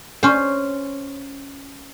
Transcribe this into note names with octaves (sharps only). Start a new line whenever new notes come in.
C#4 C5